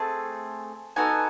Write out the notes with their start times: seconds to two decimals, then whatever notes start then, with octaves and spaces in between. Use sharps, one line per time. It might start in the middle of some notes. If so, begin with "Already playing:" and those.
Already playing: A3 C4 G#4 A5
0.96 B3 D#4 F#4 A4 G#5